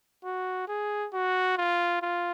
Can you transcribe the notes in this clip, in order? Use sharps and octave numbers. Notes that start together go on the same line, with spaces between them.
F#4
G#4
F#4
F4
F4